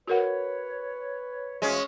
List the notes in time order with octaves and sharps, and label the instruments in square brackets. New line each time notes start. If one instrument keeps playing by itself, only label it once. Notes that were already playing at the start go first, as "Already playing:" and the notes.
[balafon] F#4 A#4 F#5 [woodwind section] B4 C#5
[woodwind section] D2 E3 F5 [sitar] G#3 C#4